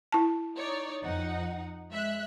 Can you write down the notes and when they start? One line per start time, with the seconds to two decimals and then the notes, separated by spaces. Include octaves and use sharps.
0.12 E4 A5
0.56 D#4 C#5 D5
1.03 F2 D#4 F#5
1.91 G#3 E5 F#6